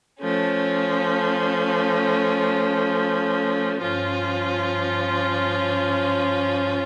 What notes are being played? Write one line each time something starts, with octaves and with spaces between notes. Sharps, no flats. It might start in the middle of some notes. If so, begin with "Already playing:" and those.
F3 A3 C#4
G2 F3 C#4 F4